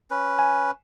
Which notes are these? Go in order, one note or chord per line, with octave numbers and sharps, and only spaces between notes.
C#4 B4
G#5